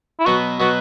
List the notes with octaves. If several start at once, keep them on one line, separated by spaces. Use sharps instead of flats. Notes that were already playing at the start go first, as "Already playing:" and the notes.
E4
B2 F#3 B3 F#4
B2 F#3 B3 F#4